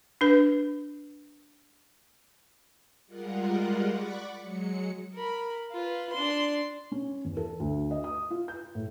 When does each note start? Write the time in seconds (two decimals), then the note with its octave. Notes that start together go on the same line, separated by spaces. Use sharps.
0.21 D4 B4
3.07 G3 G#3 F4 A#4 F#5
3.88 D5 F#5 B5 C#6 D6
4.40 F#3 G#3 C#7
5.14 A#4 B5
5.71 F4 B4
6.12 D4 C6
6.92 C#4
7.25 E2
7.37 A4
7.60 D2
7.91 D#5
8.04 D#6
8.30 F4
8.48 G6
8.75 A2